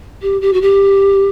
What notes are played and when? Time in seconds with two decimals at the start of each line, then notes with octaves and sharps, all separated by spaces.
0.22 G4
0.41 G4
0.53 F#4
0.61 G4